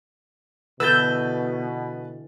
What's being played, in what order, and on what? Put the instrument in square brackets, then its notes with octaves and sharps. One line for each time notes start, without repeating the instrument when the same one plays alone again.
[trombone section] B2 [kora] D3 E3 [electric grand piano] B4 A6 [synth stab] E6 G6